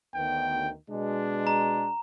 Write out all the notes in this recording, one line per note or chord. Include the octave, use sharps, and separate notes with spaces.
D2 D#3 B3 G5
B2 G#3 D4
A#5